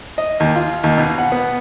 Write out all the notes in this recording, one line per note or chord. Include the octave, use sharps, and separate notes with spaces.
D#5
D#2
F4
D#2
B2
F#5
B3